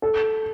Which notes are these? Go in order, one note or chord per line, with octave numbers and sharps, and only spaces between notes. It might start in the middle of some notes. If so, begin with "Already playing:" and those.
A4